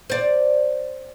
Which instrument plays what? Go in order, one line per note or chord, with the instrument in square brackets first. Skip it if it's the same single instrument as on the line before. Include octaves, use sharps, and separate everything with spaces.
[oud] C5 D5